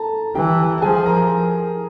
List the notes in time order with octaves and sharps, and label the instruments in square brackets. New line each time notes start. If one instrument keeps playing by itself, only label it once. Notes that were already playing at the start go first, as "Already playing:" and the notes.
Already playing: [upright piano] A4 A5 A#5
[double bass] E3 [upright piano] G4 G5
[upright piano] A5
[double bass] F3 [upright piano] G#4 G#5
[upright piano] A#4 A#5